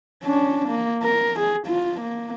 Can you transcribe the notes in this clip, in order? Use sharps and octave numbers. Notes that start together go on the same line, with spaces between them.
C#4 D4
A#3
A#4
G#4
F4
A#3